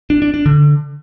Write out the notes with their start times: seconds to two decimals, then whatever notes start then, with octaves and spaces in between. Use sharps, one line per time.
0.10 D4
0.22 D4
0.34 D4
0.46 D3